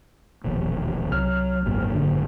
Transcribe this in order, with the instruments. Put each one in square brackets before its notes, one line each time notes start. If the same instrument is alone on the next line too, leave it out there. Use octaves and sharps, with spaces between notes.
[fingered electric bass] E1 A#1 D#2
[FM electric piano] C2 C3 F6 [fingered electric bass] F#3
[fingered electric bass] G#1 F#2 A#2
[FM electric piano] D3